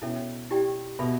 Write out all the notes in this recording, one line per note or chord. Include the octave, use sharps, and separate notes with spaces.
B2 C#4 E4 A4 C#5 E5
E4 G4 D5 G5
B2 A4 E5 B5